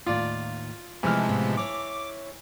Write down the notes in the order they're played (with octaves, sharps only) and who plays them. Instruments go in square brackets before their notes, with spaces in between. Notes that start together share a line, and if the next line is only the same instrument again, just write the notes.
[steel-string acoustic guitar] D#2 A2 D#3 [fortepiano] F4 D5
[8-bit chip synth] C3 F3 G#3 [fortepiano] E3 F6 [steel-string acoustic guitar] A3
[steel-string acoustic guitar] A2 B3 F4
[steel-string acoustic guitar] E4 C#5 [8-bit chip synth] D6